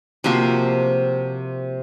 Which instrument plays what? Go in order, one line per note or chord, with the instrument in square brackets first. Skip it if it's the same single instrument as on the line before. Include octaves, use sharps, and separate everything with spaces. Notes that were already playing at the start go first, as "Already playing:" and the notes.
[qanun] C3 F3 A#3 F#4